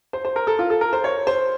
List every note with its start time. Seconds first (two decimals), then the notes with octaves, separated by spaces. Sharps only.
0.13 C5
0.25 C5
0.36 A#4
0.47 A4
0.59 F4
0.70 A4
0.81 A#4
0.93 C5
1.04 C#5
1.27 C5